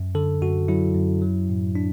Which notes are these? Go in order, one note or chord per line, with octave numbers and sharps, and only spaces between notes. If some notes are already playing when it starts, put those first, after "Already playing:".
Already playing: F#2
D3 A4
F#2 F#4
F#3 E4
F#2
F#3
A2
D4